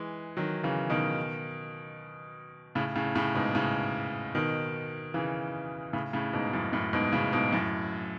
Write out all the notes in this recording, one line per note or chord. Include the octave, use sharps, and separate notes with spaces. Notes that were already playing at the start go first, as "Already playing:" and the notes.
Already playing: E3 G#3
D#3 F#3
C#3 E3
B2 D#3
A2 C#3
A2 C#3
A2 C#3
G#2 B2
A2 C#3
B2 D#3
C#3 E3
A2 C#3
A2 C#3
G#2 B2
F#2 A2
F#2 A2
G#2 B2
A2 C#3
G#2 B2
F#2 A2